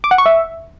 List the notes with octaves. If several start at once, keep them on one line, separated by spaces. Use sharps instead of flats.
D6
F#5
C#6
E5